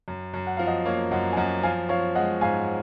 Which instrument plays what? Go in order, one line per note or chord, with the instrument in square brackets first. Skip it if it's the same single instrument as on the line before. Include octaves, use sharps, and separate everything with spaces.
[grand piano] F#2
F#2
[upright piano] F#5
[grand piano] F3 [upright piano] F5
[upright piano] D#5 F#5
[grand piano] A#3 [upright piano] C#5 F5
[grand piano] F#2 [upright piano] D#5 F#5
[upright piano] G#5
[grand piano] F#2 [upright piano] D#5 F#5
[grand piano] F3 [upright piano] F5 G#5
[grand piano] F3 [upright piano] C#5 F5
[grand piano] G#3 [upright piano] D#5 F#5
[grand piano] G#2 [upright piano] F5 G#5